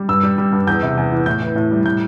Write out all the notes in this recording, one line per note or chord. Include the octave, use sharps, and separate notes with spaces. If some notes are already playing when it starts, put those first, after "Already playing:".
Already playing: G3
G2 E6
G3
G3
G2
E2 G6
C3
E2
E3
A2 G6
E3
A2
G3
A2 G6